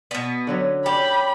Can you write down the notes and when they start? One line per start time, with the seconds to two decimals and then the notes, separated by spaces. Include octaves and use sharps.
0.11 B2 B3
0.47 D3 F#3 C#4
0.86 C#4 G4 D5 B5